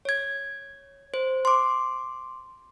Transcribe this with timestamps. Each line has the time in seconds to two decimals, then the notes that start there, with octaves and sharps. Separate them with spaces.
0.05 C#5 G#6
1.14 C5
1.45 C6 D6